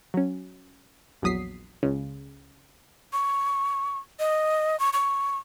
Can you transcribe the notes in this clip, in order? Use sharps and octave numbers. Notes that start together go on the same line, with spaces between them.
F#3 C#4
A#1 E2 F#3 D#6 B6 C7
C#2 C#3
C#6
D#5
C#6
C#6